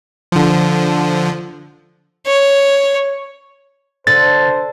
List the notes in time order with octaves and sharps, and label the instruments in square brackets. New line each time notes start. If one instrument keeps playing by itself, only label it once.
[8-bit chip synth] D3 F3
[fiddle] C#5
[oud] D3 [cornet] C5 [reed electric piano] A6